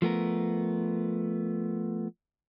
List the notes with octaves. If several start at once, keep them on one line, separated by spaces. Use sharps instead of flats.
F3 A3 B3 A#4